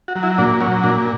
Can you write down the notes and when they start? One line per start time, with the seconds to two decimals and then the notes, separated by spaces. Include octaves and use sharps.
0.08 F#4
0.16 F#3
0.23 E4
0.38 A#2 D4
0.60 F#3 C#4
0.84 A#2 D4